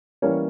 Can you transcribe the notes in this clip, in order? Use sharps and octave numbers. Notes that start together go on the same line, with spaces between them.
E3 G3 A#3 C#4 C#5